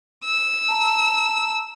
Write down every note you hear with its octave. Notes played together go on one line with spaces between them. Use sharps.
E6
A5 A#5